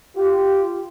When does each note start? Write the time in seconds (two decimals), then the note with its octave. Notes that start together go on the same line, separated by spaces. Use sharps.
0.16 F4 G4